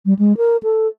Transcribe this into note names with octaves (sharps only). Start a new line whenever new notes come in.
G3
G#3
A#4
A4